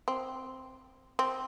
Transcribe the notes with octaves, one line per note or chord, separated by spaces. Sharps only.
C4
C4